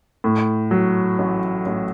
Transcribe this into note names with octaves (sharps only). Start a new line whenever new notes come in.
A2
F#3
A1
A1